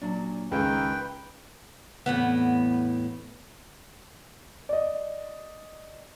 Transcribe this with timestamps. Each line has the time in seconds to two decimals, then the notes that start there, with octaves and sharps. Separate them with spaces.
0.01 A#2 F#3 D4
0.51 C#2 D#3 D#4 B4 G5
2.06 E2 A2 B3
4.69 D5 D#5